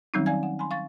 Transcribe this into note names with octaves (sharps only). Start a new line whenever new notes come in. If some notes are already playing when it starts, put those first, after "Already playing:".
D#3 F#3 G3 C4 C#4 D#4
D5 F5 G#5 G#6
F#5
G#5 B5 C6
F5 C#6 A6